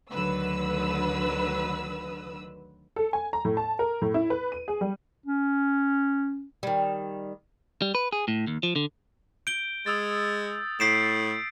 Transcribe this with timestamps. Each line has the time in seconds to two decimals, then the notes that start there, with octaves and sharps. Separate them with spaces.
0.11 D2 D3 D#3 F#3 B4 E6
2.96 A4
3.13 G#5
3.33 A#5
3.45 A2
3.57 A5
3.79 A#4
4.02 A2
4.14 E4
4.30 B4
4.52 D#7
4.68 G#4
4.81 G3
5.26 C#4
6.63 D#3 G3
7.82 G3
7.95 B4
8.13 G#4
8.28 A2
8.47 D#2
8.63 F3
8.76 D3
9.47 G6 D7 G7
9.86 G#3 D#6 E6 A6
10.80 A2 G6 B6 C7 D7 E7